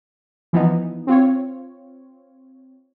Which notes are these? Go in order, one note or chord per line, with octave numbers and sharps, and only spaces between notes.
E3 F3 B3 D#4
C4 F4 C#5